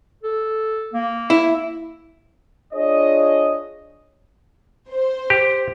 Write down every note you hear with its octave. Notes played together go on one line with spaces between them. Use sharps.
A4
A#3
E4
D4 F4 G#4 C#5 D#5
C5
G4